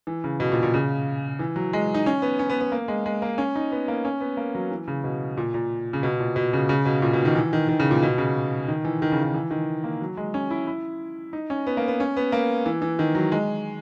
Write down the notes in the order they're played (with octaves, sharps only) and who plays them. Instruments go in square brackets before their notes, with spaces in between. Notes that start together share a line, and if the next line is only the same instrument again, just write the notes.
[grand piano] E3
C#3
B2
A#2
A#2
C#3
E3
F#3
G#3
D#4
C#4
B3
C#4
B3
B3
A#3
G#3
G#3
A#3
C#4
D#4
B3
A#3
C#4
B3
A#3
F#3
E3
C#3
B2
A#2
A#2
C#3
B2
A#2
B2
C#3
C#3
B2
A#2
B2
D#3
E3
D#3
D#3
C#3
A#2
B2
C#3
D#3
E3
D#3
C#3
D#3
E3
D#3
A#3
F#3
G#3
C#4
E4
E4
D#4
C#4
B3
A#3
B3
C#4
B3
A#3
E3
E3
D#3
F#3
G#3